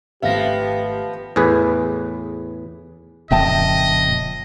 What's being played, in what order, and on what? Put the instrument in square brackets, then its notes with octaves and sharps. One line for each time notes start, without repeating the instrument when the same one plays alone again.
[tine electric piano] G#1 A3 A#6 [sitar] F3 B3 [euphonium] G4 [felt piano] E5 F5
[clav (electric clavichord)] E2 A2 G#4 B4
[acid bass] D1 [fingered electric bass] F2 A#2 C#3 [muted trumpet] D#5 [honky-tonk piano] E5 G5 A5